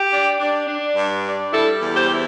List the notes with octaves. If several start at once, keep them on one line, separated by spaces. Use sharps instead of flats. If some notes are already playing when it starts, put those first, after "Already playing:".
Already playing: G4
D4
D4
D4
G2
D4
G3 E4 A4
E2
G4 C5
E4